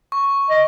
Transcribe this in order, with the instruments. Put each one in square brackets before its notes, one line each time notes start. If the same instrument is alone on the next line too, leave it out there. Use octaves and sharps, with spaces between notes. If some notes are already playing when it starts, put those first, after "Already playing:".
[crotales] C#6
[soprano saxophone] D#5